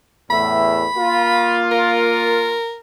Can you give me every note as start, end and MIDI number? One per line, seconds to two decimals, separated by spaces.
0.30 0.84 40
0.30 0.84 45
0.30 0.84 76
0.30 1.65 83
0.95 2.58 58
0.95 2.58 65
1.72 2.77 70